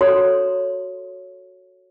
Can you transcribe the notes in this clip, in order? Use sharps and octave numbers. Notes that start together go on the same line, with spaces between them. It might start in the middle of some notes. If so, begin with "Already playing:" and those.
F#4 A4 C#5 A#5 C6